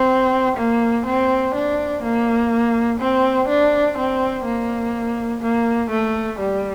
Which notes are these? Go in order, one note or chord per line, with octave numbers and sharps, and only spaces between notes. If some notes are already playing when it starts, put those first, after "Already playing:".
Already playing: C4
A#3
C4
D4
A#3
C4
D4
C4
A#3
A#3
A3
G3